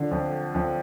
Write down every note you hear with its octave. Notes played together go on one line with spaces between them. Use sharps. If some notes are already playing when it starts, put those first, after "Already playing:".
Already playing: D3 F3
F2
F2